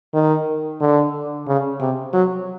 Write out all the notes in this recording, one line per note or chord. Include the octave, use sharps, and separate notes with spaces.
D#3
D3
C#3
C3
F#3